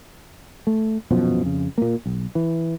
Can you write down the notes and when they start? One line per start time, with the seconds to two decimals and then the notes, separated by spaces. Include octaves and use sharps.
0.67 A3
1.10 D#1 F#2 B2 F3
1.43 F2 C#3
1.78 A#2 A#3
2.06 B1
2.35 E3